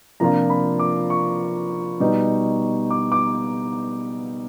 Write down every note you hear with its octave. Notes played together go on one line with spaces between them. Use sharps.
C3 F3 A#3 D4 F4 A#5
B5
D6
C#6
B2 G3 B3 D#4
D6
D6